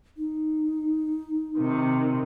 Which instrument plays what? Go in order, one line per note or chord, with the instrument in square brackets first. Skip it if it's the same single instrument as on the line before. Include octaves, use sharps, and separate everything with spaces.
[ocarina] D#4
[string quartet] C3 D#3